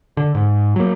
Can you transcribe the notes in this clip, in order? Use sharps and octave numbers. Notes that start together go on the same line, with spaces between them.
D3
G#2
F#3 A#3